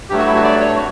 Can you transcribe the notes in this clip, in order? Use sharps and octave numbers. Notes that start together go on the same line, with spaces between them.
G2 F#3 A3 G4
F#4
E4
F#4
D5
C#5
F#4